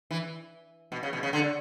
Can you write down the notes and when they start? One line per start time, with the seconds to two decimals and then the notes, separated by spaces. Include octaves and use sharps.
0.11 E3
0.92 B2
1.03 C#3
1.13 B2
1.23 C#3
1.33 D3